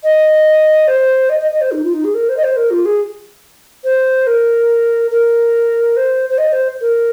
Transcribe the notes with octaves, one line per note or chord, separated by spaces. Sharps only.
D#5
C5
D#5
D#5
D#5
C5
D#4
F4
D#4
G#4
A#4
C5
D#5
C5
A#4
F4
G#4
C5
A#4
A#4
C5
C5
D#5
C5
A#4